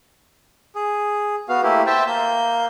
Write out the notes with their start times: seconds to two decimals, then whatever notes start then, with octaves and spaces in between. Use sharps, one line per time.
0.76 G#4
1.49 B3 F#4 F5
1.63 A3 A#3 E4 G4
1.86 C5 E5 G5 A5
2.07 A#3 G6